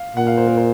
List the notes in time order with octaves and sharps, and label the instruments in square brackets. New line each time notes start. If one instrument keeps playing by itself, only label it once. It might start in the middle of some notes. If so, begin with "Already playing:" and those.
Already playing: [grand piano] F5
[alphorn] A#2 [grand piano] F#5
[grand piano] F5
C5
A#4
C5